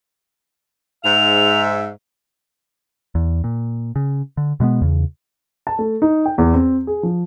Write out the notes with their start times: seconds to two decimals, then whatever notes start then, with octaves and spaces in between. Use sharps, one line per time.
1.04 G#2 E5 F7
3.15 E2
3.44 A#2
3.96 C#3
4.37 D3
4.60 B2 G#3 A3 B3
4.81 E2 C#3
5.67 A5
5.79 A3
6.02 D#4
6.26 G5
6.38 E2
6.54 C4
6.87 G#4
7.03 F3